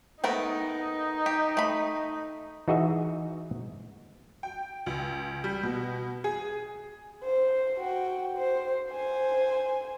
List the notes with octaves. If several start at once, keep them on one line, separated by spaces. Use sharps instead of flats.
A3 B3 D#4 A#4
G4
A3 B5
E3 D#4 F#4 G#4 D#5 E5
G5
C#2
G3
B2
G#4
C5
F#4 G5
C5
C5 G#5